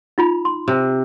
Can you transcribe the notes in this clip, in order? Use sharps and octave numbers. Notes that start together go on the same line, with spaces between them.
D#4 F4 B5
C6
C3